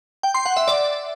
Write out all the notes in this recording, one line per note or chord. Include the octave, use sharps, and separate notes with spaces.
G5
C6
F#5
E5
D5